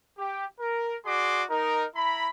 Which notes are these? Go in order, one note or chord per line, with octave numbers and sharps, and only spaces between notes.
G4
A#4
F#4 G#4 D5 C6 D6
D#4 A#4
E4 A#5 B5